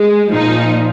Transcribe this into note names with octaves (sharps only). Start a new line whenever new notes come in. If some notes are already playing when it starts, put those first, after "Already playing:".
Already playing: G#3
A#2 F3 D#4